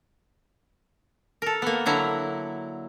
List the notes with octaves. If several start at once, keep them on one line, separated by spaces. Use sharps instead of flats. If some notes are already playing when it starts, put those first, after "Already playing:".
A4 A#4
A#3 B3
D3 F#3 E4 A#5